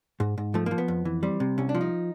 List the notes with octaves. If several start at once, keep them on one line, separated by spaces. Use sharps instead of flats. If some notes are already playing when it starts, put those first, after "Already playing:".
G#2
G#2
F3 A3
F3 A#3
B3
F2
E3
G3 C4
C3
C2 C#4
D4
F3
D#4